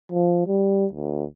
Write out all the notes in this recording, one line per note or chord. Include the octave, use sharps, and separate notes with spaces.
F3
G3
D2